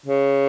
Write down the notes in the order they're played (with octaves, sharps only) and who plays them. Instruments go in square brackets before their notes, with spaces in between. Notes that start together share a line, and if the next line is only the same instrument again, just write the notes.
[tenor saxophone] C#3